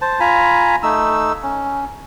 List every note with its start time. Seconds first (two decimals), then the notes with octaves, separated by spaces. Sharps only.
0.02 C5 A5
0.20 F4 G#5 A#5 B5
0.83 A3 D#4 E6
1.43 C#4